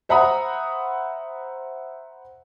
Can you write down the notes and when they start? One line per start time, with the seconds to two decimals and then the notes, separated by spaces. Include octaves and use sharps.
0.09 C5 E5 F#5 A#5 B5 D#6